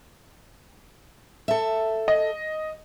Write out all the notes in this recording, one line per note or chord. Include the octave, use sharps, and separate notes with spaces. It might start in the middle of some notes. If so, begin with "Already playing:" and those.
A4 E5
D#5